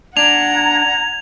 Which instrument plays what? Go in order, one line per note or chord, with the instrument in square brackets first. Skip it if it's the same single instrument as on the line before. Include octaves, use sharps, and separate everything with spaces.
[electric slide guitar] D4 [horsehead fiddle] F#5 A#5 [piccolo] G#6 [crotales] F7